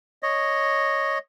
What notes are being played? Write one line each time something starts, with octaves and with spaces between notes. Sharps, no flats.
C#5 D#5